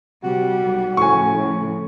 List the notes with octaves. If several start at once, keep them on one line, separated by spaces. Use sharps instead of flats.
C3 G3 F#4
B1
A2 C#3 F3 G#5 C#6
A2